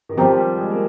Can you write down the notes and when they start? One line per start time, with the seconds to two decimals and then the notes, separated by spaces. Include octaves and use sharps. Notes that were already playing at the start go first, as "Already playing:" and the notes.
0.09 D#3
0.18 F3 C4 G4 A#4
0.37 G3
0.57 G#3
0.70 A#3